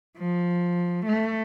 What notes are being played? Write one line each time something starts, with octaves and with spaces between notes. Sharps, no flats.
F3
A3